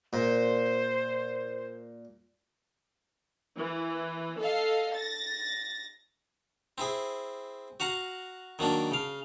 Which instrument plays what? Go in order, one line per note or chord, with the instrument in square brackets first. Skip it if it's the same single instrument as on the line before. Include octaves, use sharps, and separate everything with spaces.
[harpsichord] A#2 [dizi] C5
[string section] E3
A4 D#5 F5
A6 A#6
[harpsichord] C4 E4 G#4
F#4 F5 F#5 A#5
D#3 F#3 A#3 D4
C#3 F5